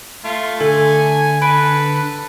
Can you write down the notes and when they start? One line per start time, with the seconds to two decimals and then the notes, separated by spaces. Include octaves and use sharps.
0.25 A3 F4
0.61 D3 A4 G#5
1.42 A4 B4 B5 D7